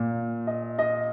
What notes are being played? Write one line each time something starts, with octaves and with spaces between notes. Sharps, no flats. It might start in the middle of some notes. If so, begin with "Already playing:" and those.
Already playing: A#2
D#5
D#5